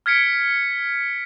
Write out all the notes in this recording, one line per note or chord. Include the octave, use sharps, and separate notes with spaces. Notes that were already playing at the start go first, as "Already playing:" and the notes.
F6 G#6 B6 C#7 D7